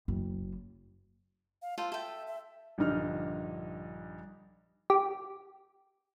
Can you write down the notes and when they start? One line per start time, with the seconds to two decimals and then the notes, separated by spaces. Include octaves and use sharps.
0.08 F#1
1.62 F5
1.78 F4 A4 C5 F5
1.92 A4 E5 G5
2.27 E5
2.78 A#1 G2 D3 D#4 F6
4.90 G4